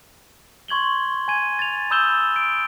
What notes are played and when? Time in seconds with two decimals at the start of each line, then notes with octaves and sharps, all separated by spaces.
0.68 C6 C#6 G#6 F#7 G7
1.28 G#5 G#6 D#7
1.59 A6 F7
1.91 B5 D#6 E6 G6 E7 G7
2.36 D7